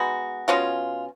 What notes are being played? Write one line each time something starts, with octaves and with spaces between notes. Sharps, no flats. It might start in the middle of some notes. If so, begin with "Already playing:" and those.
Already playing: G#3 B3 D#4 F#4
B2 G#3 C#4 F4